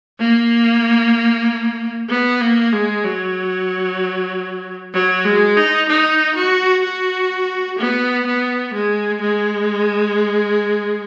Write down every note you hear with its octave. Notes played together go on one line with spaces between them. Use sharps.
A#3
B3
A#3
G#3
F#3
F#3
G#3
D#4
D#4
F#4
F#4
B3
B3
G#3
G#3